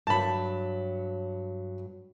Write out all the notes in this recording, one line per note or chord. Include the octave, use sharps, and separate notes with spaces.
G2 F#3 A5 B5